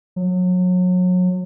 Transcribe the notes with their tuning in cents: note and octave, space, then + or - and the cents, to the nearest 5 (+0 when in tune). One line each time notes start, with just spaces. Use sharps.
F#3 -30